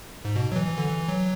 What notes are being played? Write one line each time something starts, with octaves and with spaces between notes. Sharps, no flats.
G#2
B2
F#3
E3
E3
D3
E3
F#3